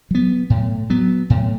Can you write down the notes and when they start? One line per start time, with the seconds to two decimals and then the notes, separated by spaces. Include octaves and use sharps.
0.11 F#3 B3
0.50 A2
0.90 F#3 B3
1.30 A2